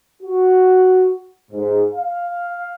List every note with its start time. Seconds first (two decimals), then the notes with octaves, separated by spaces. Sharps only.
0.22 F#4
1.51 G#2
1.94 F5